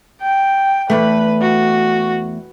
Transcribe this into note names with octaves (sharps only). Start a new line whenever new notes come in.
G5
E2 A3 B4
F#4